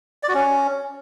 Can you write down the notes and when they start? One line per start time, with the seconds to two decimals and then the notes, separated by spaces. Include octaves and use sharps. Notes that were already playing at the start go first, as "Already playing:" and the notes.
0.23 D5
0.29 F#4
0.34 C#4